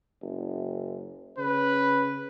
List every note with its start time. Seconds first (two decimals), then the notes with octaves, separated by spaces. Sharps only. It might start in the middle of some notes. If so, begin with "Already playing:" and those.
0.22 F#1
1.38 C#3 B4